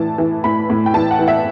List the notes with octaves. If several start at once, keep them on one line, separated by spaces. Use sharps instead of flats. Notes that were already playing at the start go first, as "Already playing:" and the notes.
Already playing: A2 E3 A5
E3
A2 B5
A2
G5
E3 A5
F#5
E3
E5